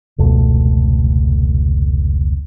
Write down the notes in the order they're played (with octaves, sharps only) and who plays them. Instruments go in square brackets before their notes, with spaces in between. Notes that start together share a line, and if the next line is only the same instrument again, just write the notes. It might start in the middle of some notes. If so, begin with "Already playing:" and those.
[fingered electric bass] F1 C#2 B2 A3